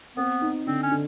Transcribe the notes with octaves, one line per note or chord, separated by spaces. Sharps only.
B3 C4
D#4
D3 C4
C#4
D3